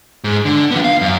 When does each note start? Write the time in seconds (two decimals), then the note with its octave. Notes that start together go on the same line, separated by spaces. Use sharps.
0.24 G#2
0.45 D3
0.71 F3 B3
0.84 F5
1.01 F#2